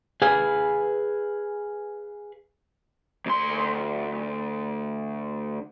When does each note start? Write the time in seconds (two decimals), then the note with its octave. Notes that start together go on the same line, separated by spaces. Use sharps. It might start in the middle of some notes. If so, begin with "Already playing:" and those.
0.22 G#4 B4 F5 G#5
3.26 D2 C6